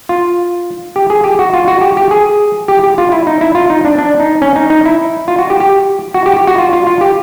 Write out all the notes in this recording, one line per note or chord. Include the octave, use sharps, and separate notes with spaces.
F4
G4
G#4
G4
F#4
F4
F#4
G4
G4
G#4
G4
G4
F4
E4
D#4
E4
F4
D#4
D4
D4
D#4
C#4
D#4
D#4
E4
F4
F#4
G4
G4
F#4
G4
G4
F#4
F4
F4
F4
G4